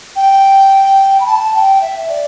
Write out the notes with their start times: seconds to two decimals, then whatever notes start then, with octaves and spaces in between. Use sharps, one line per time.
0.16 G5
1.20 B5
1.26 A5
1.54 G5
1.81 E5
2.09 D5